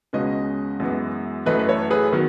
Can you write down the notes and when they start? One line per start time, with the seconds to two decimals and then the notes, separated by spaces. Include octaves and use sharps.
0.13 C#2 B2 G#3 C#4 B4 D#5
0.80 F#2 E3 G#3 B3
1.46 F#2 E3 A3 B4 D#5
1.59 B4
1.68 A4 C#5
1.90 G#4 B4
2.13 D#3 F#3 B3